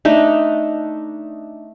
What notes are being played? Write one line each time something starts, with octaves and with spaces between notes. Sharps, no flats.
A3 D4 D#4